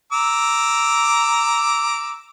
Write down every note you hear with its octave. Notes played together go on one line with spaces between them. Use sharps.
A#5 D6 E6